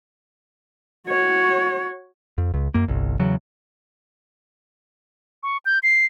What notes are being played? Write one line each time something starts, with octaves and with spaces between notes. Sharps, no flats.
F#4 C#5
F2
C#2
F#2 A#3
G1 C2
E2 C#3 F#3
C#6
G6
C7